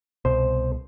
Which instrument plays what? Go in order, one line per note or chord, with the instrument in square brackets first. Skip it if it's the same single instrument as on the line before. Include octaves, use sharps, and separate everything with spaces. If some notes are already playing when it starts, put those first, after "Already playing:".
[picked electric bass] C2 B2 [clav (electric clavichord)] C5